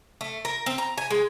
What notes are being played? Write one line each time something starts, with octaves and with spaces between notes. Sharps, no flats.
A3
A#4
C4
A#5
G#5
G#3